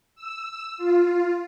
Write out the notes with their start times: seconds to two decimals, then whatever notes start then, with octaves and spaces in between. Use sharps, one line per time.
0.15 E6
0.78 F4